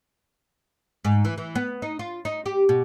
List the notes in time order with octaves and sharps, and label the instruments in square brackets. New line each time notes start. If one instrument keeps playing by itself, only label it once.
[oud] G#2
E3
E3
B3
D#4
F4
D#4
G4
B2